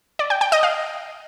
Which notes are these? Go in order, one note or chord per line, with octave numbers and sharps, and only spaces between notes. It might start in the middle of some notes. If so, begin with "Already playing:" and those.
D5
G5
G5
D#5
F5